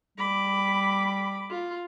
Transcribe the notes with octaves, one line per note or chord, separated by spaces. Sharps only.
G3 B5 D6
F4